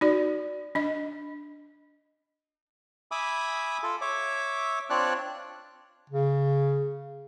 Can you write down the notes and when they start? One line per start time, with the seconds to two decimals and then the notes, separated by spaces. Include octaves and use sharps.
0.01 D#4 F#4 D5
0.75 D4 D#5
3.11 E5 G#5 B5 D6 D#6
3.83 F4 A4
4.01 C#5 E5 D6
4.90 C4 D4 F4 C#5 D5 F#6
6.10 C#3